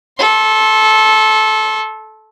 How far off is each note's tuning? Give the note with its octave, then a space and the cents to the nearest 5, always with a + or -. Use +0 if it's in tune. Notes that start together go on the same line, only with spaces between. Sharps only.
A4 -15 C6 +25